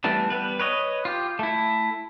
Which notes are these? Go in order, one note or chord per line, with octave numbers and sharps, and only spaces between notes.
E3 G3 A3 B3 D4
G3 B3 B4
B4 C#5 D#5
F4 G4
A3 E4